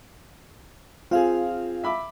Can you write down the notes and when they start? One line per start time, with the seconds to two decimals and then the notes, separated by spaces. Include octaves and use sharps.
1.11 C4 F4 G#4 F5
1.84 E5 B5 D6